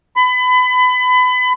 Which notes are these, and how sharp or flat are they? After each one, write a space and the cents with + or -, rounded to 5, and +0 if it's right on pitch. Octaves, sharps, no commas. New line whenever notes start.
B5 +30